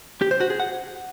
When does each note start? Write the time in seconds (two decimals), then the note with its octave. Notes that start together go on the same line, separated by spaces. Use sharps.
0.21 G4
0.31 C5
0.41 F#4
0.50 G#4
0.60 F#5